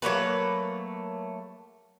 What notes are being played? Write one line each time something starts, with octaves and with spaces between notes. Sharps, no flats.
F#3 A3 A#3 B4